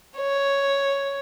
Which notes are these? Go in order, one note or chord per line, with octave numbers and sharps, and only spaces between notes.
C#5